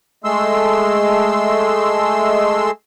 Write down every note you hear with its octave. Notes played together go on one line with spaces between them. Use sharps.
G#3 A3 C6 E6